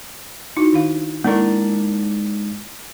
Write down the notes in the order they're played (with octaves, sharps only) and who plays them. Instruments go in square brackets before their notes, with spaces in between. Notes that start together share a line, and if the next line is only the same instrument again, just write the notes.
[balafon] D#4 E4 F#4
D#3 D4 F5
[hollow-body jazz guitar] G#2 D4 A#4 [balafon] A#3 E4